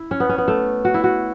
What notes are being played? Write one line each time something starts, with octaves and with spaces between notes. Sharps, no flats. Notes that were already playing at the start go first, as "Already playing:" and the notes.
Already playing: E4
C#4
B3
C#4
B3
A3
F#4
E4
F#4